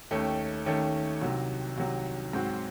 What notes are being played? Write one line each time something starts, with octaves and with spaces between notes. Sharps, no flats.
D#2 D#3 A3 C#4
D#2 D#3 A3 C#4
C2 C3 D#3 F#3
C2 C3 D#3 F#3
G#2 F#3 C4 F#4